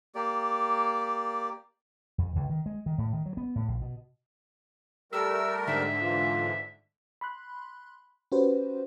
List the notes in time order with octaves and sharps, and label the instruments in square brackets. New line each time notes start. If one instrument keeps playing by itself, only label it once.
[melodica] A#3 G4 D5
[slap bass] F2
C#2
D#3
G#3
D#3
A2
D#3
F#3
B3
A2
A#1
B2
[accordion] G3 A3 A#4 [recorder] E6
[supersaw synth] G#2 D3 [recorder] E5
[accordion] E3 [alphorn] F4
[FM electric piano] B5 C6 F#6
C#4 F#4 G4 B4 C5